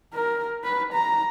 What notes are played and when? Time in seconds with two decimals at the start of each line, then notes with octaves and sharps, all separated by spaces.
0.14 A#4
0.64 B4
0.94 A#5